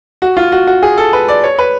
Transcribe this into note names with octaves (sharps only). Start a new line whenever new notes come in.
F#4
F4
F#4
F#4
G#4
A4
B4
D5
C#5
B4